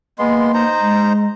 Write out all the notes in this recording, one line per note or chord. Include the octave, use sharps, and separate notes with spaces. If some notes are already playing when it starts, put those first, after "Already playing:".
G#3 A#3 B3 C6
D#4 C5 A#5
G#3